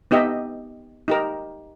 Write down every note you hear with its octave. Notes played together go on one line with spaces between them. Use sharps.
B3 D#4 G4 D#5 E5
D#4 G4 A#4